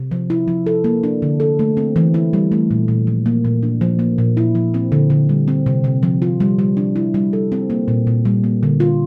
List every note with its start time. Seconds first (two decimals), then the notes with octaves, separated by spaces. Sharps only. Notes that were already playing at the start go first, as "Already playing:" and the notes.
Already playing: C3
0.11 F3
0.30 E4
0.48 F3
0.66 A4
0.84 A#3
1.03 D4
1.22 D3
1.40 A4
1.59 A3
1.77 C4
1.96 E3
2.14 E4
2.33 G3
2.52 A3
2.71 A#2
2.88 A#2
3.07 F3
3.26 A#3
3.45 A#2
3.63 D4
3.81 F3
3.99 A#3
4.18 A#2
4.37 E4
4.55 F3
4.74 C4
4.92 D3
5.10 D3
5.29 G3
5.48 C4
5.66 C3
5.84 C3
6.03 F3
6.22 F4
6.40 G3
6.59 G3
6.77 D4
6.96 E4
7.14 G3
7.33 A4
7.52 C4
7.70 A#3
7.88 A#2
8.07 A#2
8.25 G3
8.44 A#3
8.63 D3
8.80 F4